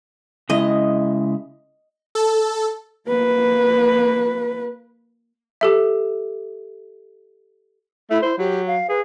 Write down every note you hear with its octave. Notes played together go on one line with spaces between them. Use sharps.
C#3 G#3 E4 D#5
A4
A#3 B4
G4 A4 E5
A3 E4
E4 C5
F#3 G4
F5
G#4 B4